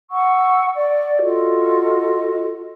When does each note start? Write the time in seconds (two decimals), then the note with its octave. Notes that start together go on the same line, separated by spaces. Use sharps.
0.10 F#5 C#6 E6
0.74 D5
1.21 F4 F#4 A4 D#5